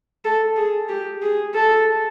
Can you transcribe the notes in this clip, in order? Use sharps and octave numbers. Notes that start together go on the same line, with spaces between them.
A4
G#4
G4
G#4
A4